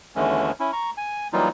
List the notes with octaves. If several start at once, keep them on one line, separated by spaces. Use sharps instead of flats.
D#2 D3 E3 G#3 A3 C#4
C#4 E4
A#5 C#6
G#5
E3 F#3 G3 A#3 D#4 F4